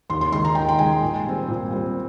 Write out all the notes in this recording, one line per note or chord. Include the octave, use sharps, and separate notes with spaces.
D#2 C6
C6
D#3 G#3 C6
A#5
D#2 G5
G5
D#3 G#3 G#5
A#2
G3 C4
A#2
G3 C4